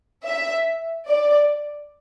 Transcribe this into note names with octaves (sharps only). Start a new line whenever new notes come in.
E5
D5